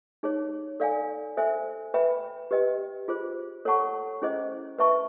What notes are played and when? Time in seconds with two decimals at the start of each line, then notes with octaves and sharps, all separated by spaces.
0.23 D#4 G#4 C#5
0.80 A4 D5 F5 G#5
1.37 A4 C5 E5 G#5
1.94 B4 E5 G5 B5
2.51 G4 B4 D#5 G5
3.08 F4 G#4 C5
3.65 A4 C#5 F#5 A5 C#6
4.22 C#4 E4 G#4 C5 D#5
4.78 B4 E5 A5 C#6